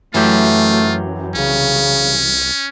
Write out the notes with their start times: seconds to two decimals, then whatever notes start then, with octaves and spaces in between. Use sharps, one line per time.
0.14 F#2 E3 F#3 A3 F4 G4
1.35 C2 C#3 C#4